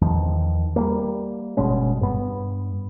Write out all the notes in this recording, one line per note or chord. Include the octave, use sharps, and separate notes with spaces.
E2 D#3 F3
G3 A3 A#3
G1 B2 G#3 C#4
G2 B3